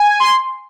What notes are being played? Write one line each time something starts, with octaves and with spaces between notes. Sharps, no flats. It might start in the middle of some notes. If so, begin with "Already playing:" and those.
Already playing: G#5
C6